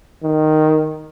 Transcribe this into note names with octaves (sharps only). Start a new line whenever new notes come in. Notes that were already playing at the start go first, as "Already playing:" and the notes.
D#3